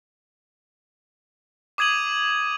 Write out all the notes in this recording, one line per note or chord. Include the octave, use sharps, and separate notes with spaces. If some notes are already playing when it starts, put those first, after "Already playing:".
D6 D#6 G#6 D#7 F#7